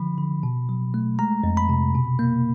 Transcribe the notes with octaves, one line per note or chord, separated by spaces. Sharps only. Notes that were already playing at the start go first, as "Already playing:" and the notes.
Already playing: D3 F3 B5
D3
B2
F#3
A3
G#3 A#5
F2
B5
C3
B2
A#3